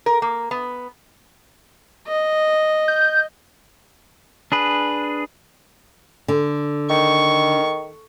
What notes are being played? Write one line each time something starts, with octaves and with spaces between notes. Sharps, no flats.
A#4
A#3
B3
D#5
G6
D4 G#4 B4
D3
D#3 C#6